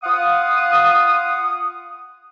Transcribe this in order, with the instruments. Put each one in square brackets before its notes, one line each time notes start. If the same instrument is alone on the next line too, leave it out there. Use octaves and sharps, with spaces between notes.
[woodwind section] F4 F5 F#5 D#6